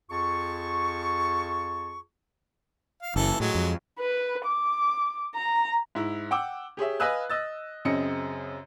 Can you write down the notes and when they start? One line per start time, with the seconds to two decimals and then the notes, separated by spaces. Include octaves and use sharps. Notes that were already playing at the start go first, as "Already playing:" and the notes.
0.10 F2 F4 G#4 A5 C#6
3.02 F5
3.16 F#1 E3 A4
3.40 A2 F#3 G#3
3.55 F2
3.99 B4
4.45 D6
5.36 A#5
5.95 G#2 E4
6.31 F#5 G5 D6 E6
6.77 G4 G#4 C#5 E5
7.00 B4 D#5 F5 G#5 E6 F#6
7.30 D#5 E6 A6
7.85 F#2 C#3 C4 D#5 C#7